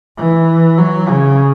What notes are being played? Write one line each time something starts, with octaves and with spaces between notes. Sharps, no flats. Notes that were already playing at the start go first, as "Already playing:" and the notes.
E3
F#3
C#3